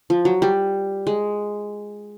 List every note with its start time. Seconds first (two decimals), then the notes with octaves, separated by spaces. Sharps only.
0.10 F3
0.25 F#3
0.42 G3
1.07 G#3